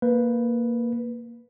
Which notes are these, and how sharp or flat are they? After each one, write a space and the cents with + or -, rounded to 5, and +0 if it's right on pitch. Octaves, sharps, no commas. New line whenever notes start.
A#3 +0 B4 -5